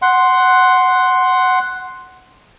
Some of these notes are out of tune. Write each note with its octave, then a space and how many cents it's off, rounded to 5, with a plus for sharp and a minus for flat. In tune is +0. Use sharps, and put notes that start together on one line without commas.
F#5 +5 C6 +0